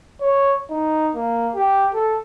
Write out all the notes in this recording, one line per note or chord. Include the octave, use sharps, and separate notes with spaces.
C#5
D#4
A#3
G4
A4